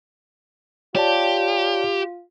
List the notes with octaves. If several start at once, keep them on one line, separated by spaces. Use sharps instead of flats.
F4 G4 C#5 D5 A5